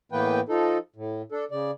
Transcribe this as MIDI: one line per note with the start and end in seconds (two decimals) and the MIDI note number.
0.12 0.40 45
0.12 0.40 52
0.12 0.40 58
0.12 0.40 59
0.12 0.40 71
0.12 0.40 79
0.49 0.78 53
0.49 0.78 63
0.49 0.78 69
0.96 1.22 45
1.32 1.45 62
1.32 1.45 69
1.51 1.71 49
1.51 1.71 74